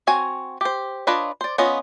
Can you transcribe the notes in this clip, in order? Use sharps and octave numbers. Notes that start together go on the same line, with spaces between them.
C4 F#4 C#5 G#5
G4 C5
D4 F4 B4 C#5 D#5
C5 D5
B3 C#4 F4 D#5